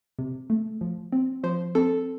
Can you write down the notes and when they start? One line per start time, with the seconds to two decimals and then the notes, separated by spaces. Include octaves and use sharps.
0.19 C3
0.50 A3
0.81 F3
1.13 C4
1.43 F3 C5
1.75 C4 A4